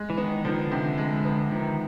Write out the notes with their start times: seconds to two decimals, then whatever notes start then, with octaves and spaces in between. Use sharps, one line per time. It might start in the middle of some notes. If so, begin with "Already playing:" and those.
Already playing: G#3
0.10 E3
0.17 D#3 B3
0.45 D3 F3
0.52 D#3
0.61 D3
0.72 C3
0.98 G#3
1.25 B3
1.52 D#3 F3